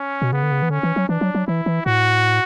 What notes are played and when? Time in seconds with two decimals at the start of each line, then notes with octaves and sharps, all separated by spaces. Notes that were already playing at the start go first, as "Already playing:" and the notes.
Already playing: C#4
0.22 B2
0.32 C#3 B3
0.43 D3
0.51 C#3
0.62 E3
0.70 D3 C#4
0.83 E3
0.96 F#3
1.09 E3 D4
1.21 F#3
1.35 F#3
1.47 E3 E4
1.66 E3
1.86 A2 F#4